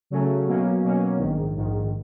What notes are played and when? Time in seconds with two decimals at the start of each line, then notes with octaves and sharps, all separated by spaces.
0.10 C#3 F#3 A3 C#4
0.46 B2 F#3 A#3 C#4
0.83 B2 F#3 A#3 C#4
1.18 A#1 G#2 D#3
1.56 A#1 G#2 D#3